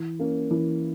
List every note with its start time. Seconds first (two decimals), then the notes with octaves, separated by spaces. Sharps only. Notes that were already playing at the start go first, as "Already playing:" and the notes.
Already playing: E3
0.19 A#3 C#4
0.51 E3